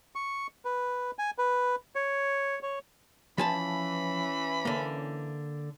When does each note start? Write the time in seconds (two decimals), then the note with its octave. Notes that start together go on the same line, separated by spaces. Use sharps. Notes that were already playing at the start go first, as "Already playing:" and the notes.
0.15 C#6
0.65 B4
1.19 G#5
1.38 B4
1.95 C#5
2.63 C#5
3.38 E3 F3 C#4 G#5 A5 B5
4.65 D3 A#3